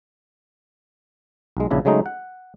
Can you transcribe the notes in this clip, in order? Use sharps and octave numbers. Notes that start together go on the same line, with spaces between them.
B1 G#3
A#1 C#3 D4 E4
C#3 F#3 G#3 A3 D#4
F#5